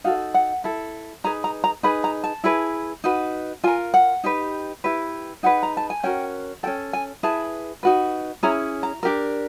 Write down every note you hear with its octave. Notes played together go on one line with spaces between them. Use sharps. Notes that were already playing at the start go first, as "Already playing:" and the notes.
D#4 F#4 A4 F5
F#5
E4 A4
D#4 G#4 B4 A#5
A#5
A#5
D#4 G#4 B4 B5
A#5
A5
E4 G#4 B4
D#4 F#4 B4
F4 A#4 G#5
F#5
D#4 G4 B4
E4 G4 B4
D#4 G#4 B4 F#5
A#5
A5
G#5
C#4 F#4 A#4 G5
C#4 F#4 A4 G5
G#5
E4 G#4 B4 A5
D#4 F#4 B4
C#4 E4 G#4 A#5
A#5
D4 G4 A#4